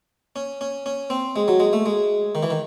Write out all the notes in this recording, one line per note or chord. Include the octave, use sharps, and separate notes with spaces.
C#4
C#4
C#4
C4
G#3
F#3
G#3
A3
G#3
D#3
E3
D#3